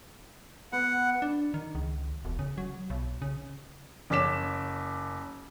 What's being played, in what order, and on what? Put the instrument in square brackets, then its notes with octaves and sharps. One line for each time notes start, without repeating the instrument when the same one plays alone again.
[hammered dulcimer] B3 [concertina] F#5
[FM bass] D4
D#3
C#2
E1
C#3
F#3
B1
C#3
[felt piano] F#1 C#4 D6 B6 E7